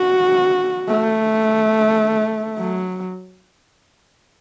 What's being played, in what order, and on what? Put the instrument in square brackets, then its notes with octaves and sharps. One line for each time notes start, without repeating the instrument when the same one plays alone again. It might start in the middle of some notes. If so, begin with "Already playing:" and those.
Already playing: [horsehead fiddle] F#4
A3
F#3